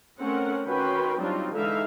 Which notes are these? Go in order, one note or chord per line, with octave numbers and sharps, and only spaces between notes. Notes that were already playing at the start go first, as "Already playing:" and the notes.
A3 C4 C#4 A#4 F#5
D#3 C#4 F#4 B4 G5 C6
F#3 G3 C4 D4 D#4 F4
D3 E3 G#3 D#4 E5 F5